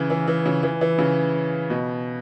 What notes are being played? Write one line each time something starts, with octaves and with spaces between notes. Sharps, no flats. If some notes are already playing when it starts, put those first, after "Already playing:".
Already playing: C#3 E3
E3
E3
C#3
E3
E3
C#3
B2